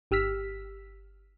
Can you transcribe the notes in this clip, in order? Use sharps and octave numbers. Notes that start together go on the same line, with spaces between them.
G1 G4 E6 F6 B6